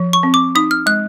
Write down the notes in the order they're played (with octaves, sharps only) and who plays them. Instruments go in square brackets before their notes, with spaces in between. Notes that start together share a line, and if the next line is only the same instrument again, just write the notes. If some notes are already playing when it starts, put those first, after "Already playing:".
Already playing: [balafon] F3
[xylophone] C#6
[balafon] C4
[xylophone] D6
[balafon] D#4 [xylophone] D#6
[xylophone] F6
[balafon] G#3 [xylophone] F#6